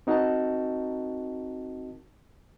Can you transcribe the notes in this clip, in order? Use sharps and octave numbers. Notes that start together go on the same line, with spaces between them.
C4 D#4 F#4 A#4 D#5 A5